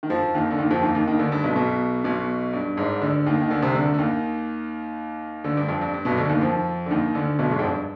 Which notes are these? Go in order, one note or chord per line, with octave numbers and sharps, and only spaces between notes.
D#3
F2 F3
D#2 D#3
D3
D#2 D#3
F2 F3
D#2 D#3
D#2 D#3
D#2 D#3
D2 D3
G2
B1 B2
B1 B2
B1 B2
G2
G#1 G#2
D2 D3
D#2 D#3
D#3
D2 D3
C2 C3
D2 D3
D3
D#2 D#3
D2 D3
G2
F2
G2
G2
B1 B2
D2 D3
D#2 D#3
F2 F3
D3
D#2 D#3
D2 D3
B1 B2
G#1 G#2
F2
G2